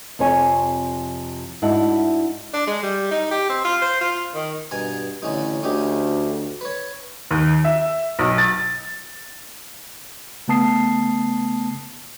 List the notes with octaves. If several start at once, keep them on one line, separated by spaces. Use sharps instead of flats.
F2 C3 F3 C5 C#5 G#5
G#2 D4 E4 F#4 F#5 A5
D4
G#3
G3
D#4
G4
C4
F4
C5
F4
D#3
G2 B2 G#5 A#5
A1 D3 C#4 D#4
D2 C#4 D#4 G4
B4 C#5
D#2
E5
B1
A6
C#3 A3 B3 A5 D#6 C7